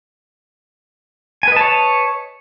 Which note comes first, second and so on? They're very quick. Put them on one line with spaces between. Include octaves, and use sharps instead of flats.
G#5 B4 D#5 A5 C#5